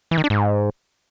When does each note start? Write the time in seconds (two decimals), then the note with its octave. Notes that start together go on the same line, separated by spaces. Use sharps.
0.11 E3
0.18 D#3
0.24 D4
0.30 G#2